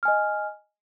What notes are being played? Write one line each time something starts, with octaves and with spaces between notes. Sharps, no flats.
D#5 G#5 F6